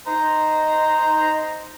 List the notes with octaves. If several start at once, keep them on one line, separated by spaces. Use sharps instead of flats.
D#4 C5 A#5